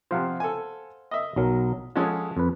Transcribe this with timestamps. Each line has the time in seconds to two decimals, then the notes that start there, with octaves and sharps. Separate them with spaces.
0.11 C3 F3 C5 F5 F#5
0.40 A4 G#5
1.11 D#5 E5
1.36 B1 F#3 A#4
1.96 F3 G#3 C#4 G#4 A4 F#5
2.37 F2 B4